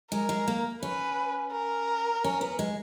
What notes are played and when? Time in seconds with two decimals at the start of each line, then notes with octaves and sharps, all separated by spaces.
0.12 G#3 A#4
0.29 G#3
0.48 A#3
0.82 C#4 B4
1.53 A#4
2.24 C#4
2.41 B3
2.59 G#3